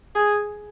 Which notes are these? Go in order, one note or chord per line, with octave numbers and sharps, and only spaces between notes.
G#4